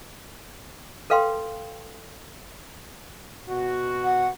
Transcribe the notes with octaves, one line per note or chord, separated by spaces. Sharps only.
A4 B4 F5 G5 C6
B2 F#4
F#5